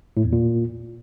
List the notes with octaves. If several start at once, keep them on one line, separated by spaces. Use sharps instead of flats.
A2
E2
A#2